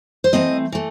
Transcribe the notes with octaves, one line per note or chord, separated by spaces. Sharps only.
C5
E3 A3 C4 D#5
E3 A3